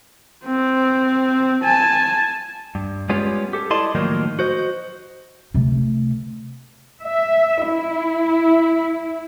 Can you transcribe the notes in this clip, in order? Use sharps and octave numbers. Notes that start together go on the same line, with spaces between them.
C4
G#5 A5
G2
G3 G#3 B3 C#4 F4 G4
G4 A4
E4 D5 D#5 A5 C6
A2 D#3 F3 F#3 A#3 D#4
F#4 C5 D#5
C3 A3
E5
E4